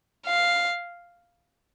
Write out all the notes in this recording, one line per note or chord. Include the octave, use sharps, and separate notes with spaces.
F5